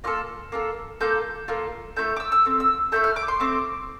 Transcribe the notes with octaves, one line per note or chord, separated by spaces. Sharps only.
A#3 F4 A4 F6
A#3 F4 A4
A#3 F4 A4 G6
A#3 F4 A4
A3 C4 E4 A4 G6
D6
E6
E6
A3 C4
E6
A3 C4 E4 A4 G6
F6
D6
C6
A3 C4 D6